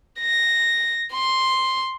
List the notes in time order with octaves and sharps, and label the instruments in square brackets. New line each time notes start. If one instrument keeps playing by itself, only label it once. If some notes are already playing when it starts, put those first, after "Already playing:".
[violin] A#6
C6